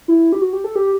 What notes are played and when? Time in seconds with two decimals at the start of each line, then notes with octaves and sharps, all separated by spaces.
0.08 E4
0.33 G4
0.42 F#4
0.53 G4
0.64 A4
0.76 G4